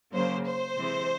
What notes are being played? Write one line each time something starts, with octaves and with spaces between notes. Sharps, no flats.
C#3 F#3 A#3 C5
C5
C3 E3 G#3